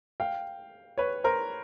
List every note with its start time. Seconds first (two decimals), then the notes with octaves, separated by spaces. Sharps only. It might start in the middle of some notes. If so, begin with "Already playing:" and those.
0.20 F5 G5
0.98 B4 C#5
1.24 A#4 C5